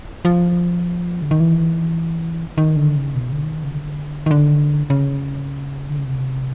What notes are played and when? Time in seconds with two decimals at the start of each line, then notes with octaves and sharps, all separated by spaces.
0.25 F3
1.22 D3
1.31 D#3
1.40 E3
2.58 D#3
2.76 D3
2.96 C#3
3.15 B2
3.32 D3
3.44 D#3
3.64 C#3
3.73 D3
4.26 D#3
4.31 D3
4.90 C#3
5.90 D3
5.98 C#3
6.05 C3